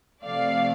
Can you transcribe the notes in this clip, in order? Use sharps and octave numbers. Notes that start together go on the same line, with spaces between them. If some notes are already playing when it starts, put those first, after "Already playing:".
C3 F3 A3 D5 F5